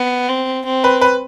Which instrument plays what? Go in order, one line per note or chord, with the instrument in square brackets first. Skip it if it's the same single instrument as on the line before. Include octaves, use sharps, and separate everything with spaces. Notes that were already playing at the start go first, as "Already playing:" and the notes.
Already playing: [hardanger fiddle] B3
C4
C4
[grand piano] B4
B4